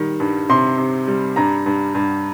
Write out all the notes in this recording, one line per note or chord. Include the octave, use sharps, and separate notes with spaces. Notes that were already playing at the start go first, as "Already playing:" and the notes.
Already playing: D#3 G3
G2
C3 C6
C3
G3
G2 A#5
G2
G2